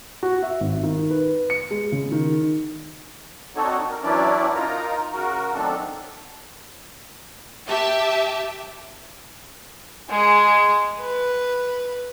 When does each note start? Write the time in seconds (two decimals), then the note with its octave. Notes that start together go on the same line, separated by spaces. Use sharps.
0.23 F#4
0.43 E5
0.60 G#1
0.83 D#3
1.11 B4
1.50 C#7
1.71 G#3
1.92 C#3
2.12 D#3
3.56 C4 D4 D#4 F#4 A4 C#5
3.89 A#4
4.03 E3 F#3 C#4 D4 E4 D5
4.55 D#4 F4 A#4 A#5
5.13 C#3 F#4 A#4
5.54 D#3 F#3 A3 C4 D4 A4
7.67 G4 E5 A5
10.10 G#3 G#4
11.00 B4